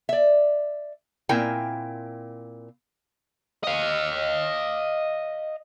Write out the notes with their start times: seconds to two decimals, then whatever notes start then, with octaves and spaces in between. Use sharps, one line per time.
0.09 D5 E5
1.29 A#2 C4 E4 A#4 G5 G#5
3.63 D#5 F5